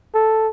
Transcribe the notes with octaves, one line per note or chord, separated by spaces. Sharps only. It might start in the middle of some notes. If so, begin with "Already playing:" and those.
A4